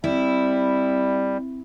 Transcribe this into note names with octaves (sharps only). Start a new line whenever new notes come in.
G3 C4 E4